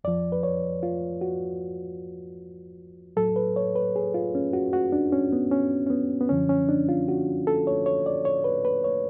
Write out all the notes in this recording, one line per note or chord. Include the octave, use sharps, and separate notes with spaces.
F2 F3 D5
B4
C#5
F4
F#4
A2 F#3 A4
B4
C#5
B4
G#4
F4
C#4
F#4
F#4
D4
C#4
B3
C#4
C#4
B3
B3
F#2 D3 F3 C#4
C#4
D4
F4
F#4
A4
C#5
C#5
D5
C#5
B4
B4
C#5